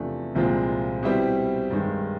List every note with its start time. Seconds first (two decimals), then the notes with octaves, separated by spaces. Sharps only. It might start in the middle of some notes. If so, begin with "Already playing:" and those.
Already playing: E2 C3 F3 A3 D4
0.35 C2 A#2 F3 G#3 C4
1.03 B2 G3 C4 E4 G4
1.71 G2 D#3 G#3